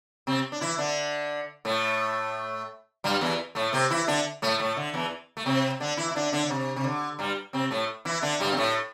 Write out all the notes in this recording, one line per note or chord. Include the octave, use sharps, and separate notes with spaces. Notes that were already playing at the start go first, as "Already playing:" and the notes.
C3 C4
D4
E3 E4
D3 D4
A2 A3
G2 G3
E2 E3
A2 A3
C3 C4
E3 E4
D3 D4
A2 A3
A2 A3
D3
E2 E3
A3
C3 C4
D3 D4
E3 E4
E4
D3 D4
D3 D4
D3
C3
C3
D3
G2 G3
C3 C4
A2 A3
E3 E4
D3 D4
G2 G3
C4
A2 A3